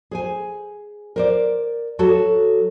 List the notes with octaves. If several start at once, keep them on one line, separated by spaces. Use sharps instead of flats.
G#4 C5 G#5
A#4 C5 D5
F#3 F#4 A4 A5